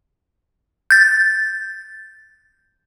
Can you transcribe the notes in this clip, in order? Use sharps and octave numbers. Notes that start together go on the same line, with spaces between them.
G6 A6